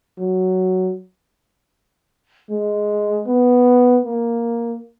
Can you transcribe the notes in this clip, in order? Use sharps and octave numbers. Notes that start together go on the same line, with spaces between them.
F#3
G#3
B3
A#3